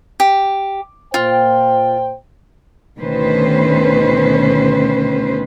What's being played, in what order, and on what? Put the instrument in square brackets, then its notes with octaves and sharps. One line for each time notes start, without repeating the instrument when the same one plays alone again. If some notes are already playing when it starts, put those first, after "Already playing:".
[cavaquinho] G4
[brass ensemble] A#2 C5 G5 [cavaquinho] F4
[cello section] D2 B2 D#3 C#4 B4 C5